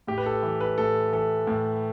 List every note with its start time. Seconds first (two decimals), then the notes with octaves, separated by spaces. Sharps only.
0.07 A2 G4
0.18 B4
0.26 A4
0.43 E3
0.61 B4
0.78 A2 A4
1.12 E3 A4
1.47 A2